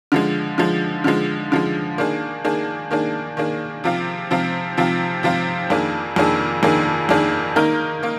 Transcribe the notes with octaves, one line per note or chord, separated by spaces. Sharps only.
D3 F3 G#3
D3 F3 G#3
D3 F3 G#3
D3 F3 G#3
D#3 A#3 D4 G#4
D#3 A#3 D4 G#4
D#3 A#3 D4 G#4
D#3 A#3 D4 G#4
C3 F3 C4 F4
C3 F3 C4 F4
C3 F3 C4 F4
C3 F3 C4 F4
F2 D#3 A#3 D4 G#4
F2 D#3 A#3 D4 G#4
F2 D#3 A#3 D4 G#4
F2 D#3 A#3 D4 G#4
D#3 A#3 D#4 A#4
D#3 A#3